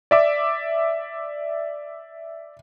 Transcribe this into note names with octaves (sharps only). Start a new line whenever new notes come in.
D5 E5 D6